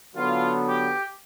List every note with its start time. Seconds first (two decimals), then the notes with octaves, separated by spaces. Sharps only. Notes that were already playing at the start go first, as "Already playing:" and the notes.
0.15 D3 F#3 B3 F4
0.66 G4